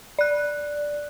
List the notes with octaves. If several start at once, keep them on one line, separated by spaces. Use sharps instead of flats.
D5 F#6